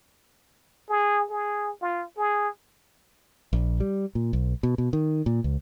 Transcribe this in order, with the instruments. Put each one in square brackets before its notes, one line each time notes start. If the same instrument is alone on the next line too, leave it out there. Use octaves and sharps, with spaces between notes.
[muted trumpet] G#4
G#4
F4
G#4
[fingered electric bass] A#1
G3
A#2
B1
B2
B2
D#3
A#2
C#2